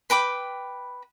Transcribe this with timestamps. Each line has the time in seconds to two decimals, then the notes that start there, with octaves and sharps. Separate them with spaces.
0.10 B4 G5 B5 D6